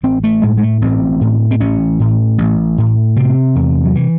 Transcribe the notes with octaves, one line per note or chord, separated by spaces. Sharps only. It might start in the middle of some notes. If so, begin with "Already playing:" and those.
A1 C4
A3
A2 G#3
G#3
A3
A1 C4
A2
C4
A1 C#4
A2
A1
A2
C3 C4
E2
F#3
E3